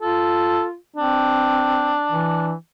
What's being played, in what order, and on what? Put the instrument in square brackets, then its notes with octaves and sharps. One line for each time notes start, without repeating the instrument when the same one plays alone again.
[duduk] F4 [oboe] A4
[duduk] C4 [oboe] D4
[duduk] E3